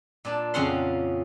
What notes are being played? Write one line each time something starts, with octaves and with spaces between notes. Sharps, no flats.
A#2 D4 A5
F2 C#3 C#4 F5 F#5 C6